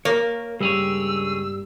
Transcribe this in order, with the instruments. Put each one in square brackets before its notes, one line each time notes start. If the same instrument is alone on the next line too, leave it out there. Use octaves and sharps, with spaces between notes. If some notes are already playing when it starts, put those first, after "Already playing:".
[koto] A#3 [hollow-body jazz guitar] A#4 C#5
[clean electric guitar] C#2 G#4 C#5 [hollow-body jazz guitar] G2 G3 [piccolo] E6